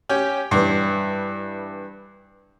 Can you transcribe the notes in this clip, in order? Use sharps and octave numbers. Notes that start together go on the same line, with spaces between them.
C#4 G4
G2 E3